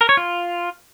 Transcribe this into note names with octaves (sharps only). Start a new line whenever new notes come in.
A#4
C#5
F4